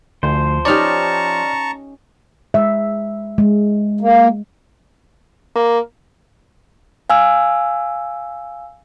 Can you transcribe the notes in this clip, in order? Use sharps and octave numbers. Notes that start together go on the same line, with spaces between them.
D2 F3 C5
C#4 D#4 G4 D5 A5 A#5 C#6 F6
G#3 E5
G#3
A#3
A#3
F5 G#5 E6